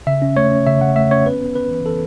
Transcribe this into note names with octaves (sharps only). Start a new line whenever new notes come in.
C#3 E5
C#4
A3 C#5
C#4
C#3 E5
C#3 F#5
A3 E5
C#4 C#5
B3 B4
B3
B3 B4
E3
E3 A4